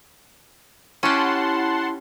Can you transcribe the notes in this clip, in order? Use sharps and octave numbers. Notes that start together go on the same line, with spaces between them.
C#4 E4 G4 F#5 A5 C6